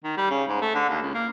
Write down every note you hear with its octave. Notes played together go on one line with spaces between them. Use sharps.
D#3
G3
C#3
G#2
A3
D3
D#2
C#2
A#3